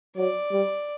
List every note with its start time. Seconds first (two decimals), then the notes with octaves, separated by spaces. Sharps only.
0.17 F#3 D5
0.52 G3